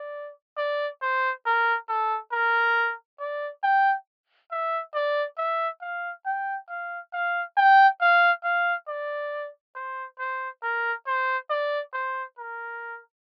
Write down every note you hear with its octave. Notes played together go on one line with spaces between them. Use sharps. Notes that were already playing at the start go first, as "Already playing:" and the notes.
Already playing: D5
D5
C5
A#4
A4
A#4
D5
G5
E5
D5
E5
F5
G5
F5
F5
G5
F5
F5
D5
C5
C5
A#4
C5
D5
C5
A#4